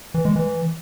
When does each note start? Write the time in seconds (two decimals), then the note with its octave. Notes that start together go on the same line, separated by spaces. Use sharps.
0.14 E3
0.25 G#3
0.36 E3